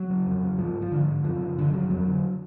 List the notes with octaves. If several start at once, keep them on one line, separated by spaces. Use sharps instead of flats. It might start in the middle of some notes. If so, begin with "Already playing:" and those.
Already playing: F#3
C#3
F2
C#3
G#2 F3
F3
G#2 D3
F#2 F3
C#3
F#2 D3
C#3 F#3
F2 F#3
D3